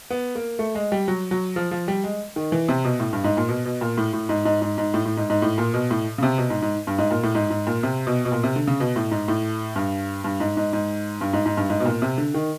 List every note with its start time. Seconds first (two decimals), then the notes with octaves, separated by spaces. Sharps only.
0.10 B3
0.35 A#3
0.59 A3
0.75 G#3
0.92 G3
1.08 F#3
1.31 F#3
1.56 F3
1.71 F3
1.88 G3
2.04 G#3
2.36 D#3
2.52 E3
2.68 C3
2.85 B2
3.00 A2
3.13 G2
3.24 G#2
3.37 A#2
3.49 B2
3.65 B2
3.81 A#2
3.97 A2
4.13 A2
4.29 G#2
4.45 G#2
4.62 G#2
4.78 G#2
4.94 A2
5.05 A2
5.17 G#2
5.30 G#2
5.42 A2
5.58 A#2
5.74 B2
5.91 A2
6.18 C#3
6.23 C3
6.38 B2
6.50 G#2
6.62 G#2
6.87 G2
6.98 G#2
7.11 A#2
7.23 A2
7.35 G#2
7.50 G#2
7.67 A#2
7.83 C3
8.07 B2
8.25 B2
8.32 A#2
8.43 C3
8.56 D3
8.67 C#3
8.80 B2
8.96 A2
9.11 G#2
9.28 A2
9.76 G2
10.24 G2
10.40 G#2
10.57 G#2
10.73 G#2
11.21 G2
11.33 G#2
11.46 G#2
11.57 G2
11.70 G#2
11.80 B2
11.85 A#2
12.02 C3
12.18 D3
12.34 D#3